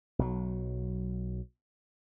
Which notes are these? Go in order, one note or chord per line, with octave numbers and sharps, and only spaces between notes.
B1 F#3